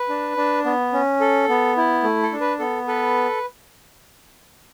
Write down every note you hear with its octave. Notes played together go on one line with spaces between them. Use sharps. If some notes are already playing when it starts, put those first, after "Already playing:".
Already playing: B4
D4
D4
B3
C#4
A4
B3
E4
A3
A4
D4
B4
B3 A4
A4 B4